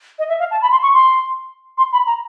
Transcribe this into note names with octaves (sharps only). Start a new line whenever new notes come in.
D#5
E5
F5
A5
B5
C6
C#6
C6
C6
B5
A#5